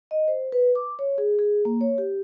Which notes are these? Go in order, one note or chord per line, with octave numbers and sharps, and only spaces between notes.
D#5
C5
B4
D6
C#5
G#4
G#4
A#3
C#5
G4